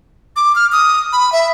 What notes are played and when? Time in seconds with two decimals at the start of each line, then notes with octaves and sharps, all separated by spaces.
0.36 D6
0.56 F6
0.72 D#6
1.13 B5
1.32 E5